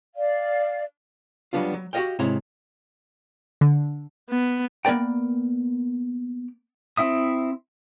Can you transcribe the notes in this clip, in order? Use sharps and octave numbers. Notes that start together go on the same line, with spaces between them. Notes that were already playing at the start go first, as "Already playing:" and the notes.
D5 F5
F#3 G3 A3 B3 D4 F4
F#3
F#4 G4 A4 D#5 F5 G5
G#2 C3 E4 C#5 D#5 A#5
D3
B3
A#3 B3 A#4 D5 G5
C4 E4 E5 D#6